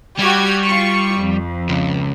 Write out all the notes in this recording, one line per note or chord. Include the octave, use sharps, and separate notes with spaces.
G3 F#4 G4 G#6
F4 C#6
F2
C#2